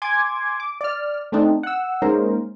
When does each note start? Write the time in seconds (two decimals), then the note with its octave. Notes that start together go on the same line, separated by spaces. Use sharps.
0.02 G#5 C6 D6 G#6
0.60 D6
0.81 D5 F6
1.32 A3 C4 D4 D#4
1.63 F#5 E6
2.02 G#3 A#3 C#4 D#4 A#4 C5